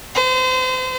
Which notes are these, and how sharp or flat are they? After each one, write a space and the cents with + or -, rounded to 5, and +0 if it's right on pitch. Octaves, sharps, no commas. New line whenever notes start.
C5 -35 A#5 +0